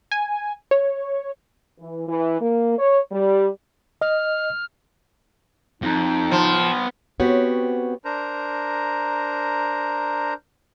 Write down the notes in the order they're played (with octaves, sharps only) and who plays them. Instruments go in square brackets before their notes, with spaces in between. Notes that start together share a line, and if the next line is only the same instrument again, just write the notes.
[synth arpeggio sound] G#5
C#5
[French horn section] E3
E3
A#3
C#5
G3
[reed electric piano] D#5 [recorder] F6
[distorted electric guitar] F2 [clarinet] D#4
[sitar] F3 [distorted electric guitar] B3 C6
[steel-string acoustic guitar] B3 C4 F#4 G4 C#5
[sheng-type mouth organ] D4 A#4 C5 A#5